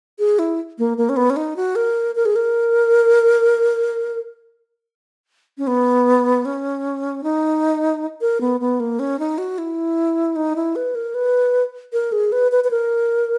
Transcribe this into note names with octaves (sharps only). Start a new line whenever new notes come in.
G#4
E4
A#3
A#3
C#4
B3
C#4
D#4
F#4
A#4
A#4
G#4
A#4
C#4
B3
C#4
D#4
A#4
B3
B3
A#3
C#4
D#4
F#4
E4
D#4
E4
B4
A#4
B4
A#4
G#4
B4
B4
B4
A#4